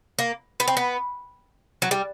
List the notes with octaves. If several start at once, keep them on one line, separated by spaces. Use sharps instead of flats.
A#3
B3
C4
B3
F#3
G3